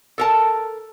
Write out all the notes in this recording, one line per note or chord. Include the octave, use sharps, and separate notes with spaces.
A4 A#4 A5